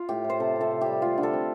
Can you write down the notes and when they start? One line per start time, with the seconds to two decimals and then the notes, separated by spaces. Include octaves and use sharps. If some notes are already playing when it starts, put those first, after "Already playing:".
Already playing: F4
0.09 A2 G4
0.24 A2
0.30 C5
0.40 C3 A4
0.56 C3 A4
0.71 C3
0.81 G3 G4
1.02 A3 F4
1.18 D3
1.23 A4
1.33 C4